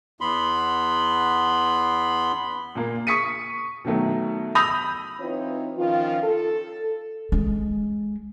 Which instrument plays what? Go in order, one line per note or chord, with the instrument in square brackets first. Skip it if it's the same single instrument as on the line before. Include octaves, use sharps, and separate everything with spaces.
[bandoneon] E2 B3 B5 C6
[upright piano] A#2 A#3
C#6 D#6 B6 C#7 D#7
B2 D#3 F#3 A3
B5 D#6 E6 G6 A#6 F7
[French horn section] E3 C4 D#4 F4 B4 C#5
D#3 F3 C#4 F4
A4
[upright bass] G#3